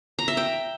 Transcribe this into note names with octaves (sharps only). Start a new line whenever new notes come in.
A#5
E5
G5